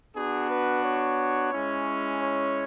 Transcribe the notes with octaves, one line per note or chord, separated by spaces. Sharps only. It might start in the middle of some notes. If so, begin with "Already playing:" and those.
B3 D4 F#4 G#4
B4
C#5
G#3 C#4 E4
C#5